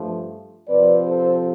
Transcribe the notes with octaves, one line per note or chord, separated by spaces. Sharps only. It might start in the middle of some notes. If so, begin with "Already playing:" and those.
Already playing: G2 F3 A3
C3 F3 C4 B4 D5
A4 C5